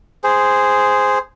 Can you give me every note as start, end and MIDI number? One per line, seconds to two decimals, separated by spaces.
0.24 1.18 68
0.24 1.18 72